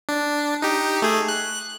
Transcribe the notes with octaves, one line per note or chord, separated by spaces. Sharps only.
D4
D#4 G4
A3 G#4
F#6